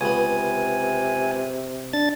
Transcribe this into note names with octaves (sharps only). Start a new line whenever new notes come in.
C#2 C3 B3 G#5
D4 A6